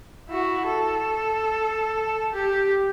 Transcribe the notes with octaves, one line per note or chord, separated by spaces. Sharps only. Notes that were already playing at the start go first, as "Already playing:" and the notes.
E4 F#4
A4
G4